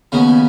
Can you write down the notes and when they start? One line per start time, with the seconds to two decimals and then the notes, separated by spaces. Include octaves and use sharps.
0.12 D#2 C#3 F#3 B3